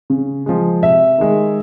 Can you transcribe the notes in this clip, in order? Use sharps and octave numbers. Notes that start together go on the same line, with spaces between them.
C#3
F3 G#3
C3 E5
D#3 G#3